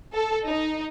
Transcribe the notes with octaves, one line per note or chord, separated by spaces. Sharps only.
A4
D#4